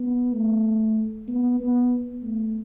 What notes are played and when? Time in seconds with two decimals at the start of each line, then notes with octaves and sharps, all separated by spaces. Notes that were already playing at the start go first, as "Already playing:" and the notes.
Already playing: B3
0.33 A3
1.28 B3
1.60 B3
2.22 A3